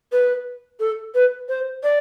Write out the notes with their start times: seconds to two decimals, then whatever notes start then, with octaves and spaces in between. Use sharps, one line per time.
0.12 B4
0.80 A4
1.14 B4
1.49 C5
1.83 D5